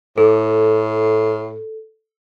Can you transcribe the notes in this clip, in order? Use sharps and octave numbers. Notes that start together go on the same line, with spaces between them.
A2 A4